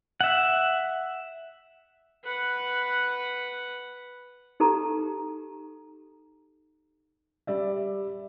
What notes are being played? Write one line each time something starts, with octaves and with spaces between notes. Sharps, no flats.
E5 F#5
B4 F#5
D#4 G4 A4 A#5
G3 D5 E5